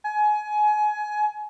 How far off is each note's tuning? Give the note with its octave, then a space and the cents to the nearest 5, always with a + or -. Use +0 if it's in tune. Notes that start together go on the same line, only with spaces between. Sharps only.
G#5 +25